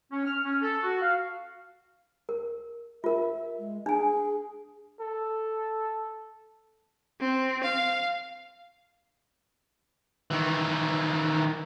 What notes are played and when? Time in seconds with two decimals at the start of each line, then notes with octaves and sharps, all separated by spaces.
0.12 C#4
0.25 F6
0.45 C#4
0.62 A4
0.82 F#4
1.01 F5
2.29 A#4
3.04 F4 A#4 E5
3.59 G#3
3.86 D4 G#4 G#5
5.01 A4
7.20 C4
7.63 F5
10.31 D#3 E3